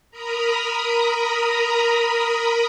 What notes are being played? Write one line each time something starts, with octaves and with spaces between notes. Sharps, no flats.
A#4 A#5 B5 D#6